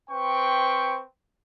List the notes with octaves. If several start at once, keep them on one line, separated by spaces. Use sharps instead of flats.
C4 B4 C5 G5 C#6